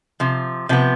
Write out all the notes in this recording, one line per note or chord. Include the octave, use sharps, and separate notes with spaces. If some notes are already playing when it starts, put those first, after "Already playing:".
C3 F3
C3 F3 B3